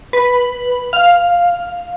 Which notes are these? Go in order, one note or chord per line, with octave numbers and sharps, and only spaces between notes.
B4
F5